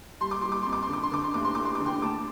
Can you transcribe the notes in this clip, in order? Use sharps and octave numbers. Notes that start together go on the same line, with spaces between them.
G3 C6
D6
G3 C6
D6
F2 C6
D6
C6
D3 D6
C6
D3 D6
C6
F1 D6
C6
F1 D6
C6
D3 D6
G5 C6
D2 A5 D6